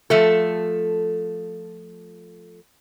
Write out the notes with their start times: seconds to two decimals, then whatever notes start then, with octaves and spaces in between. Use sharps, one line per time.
0.10 F3 A3 A4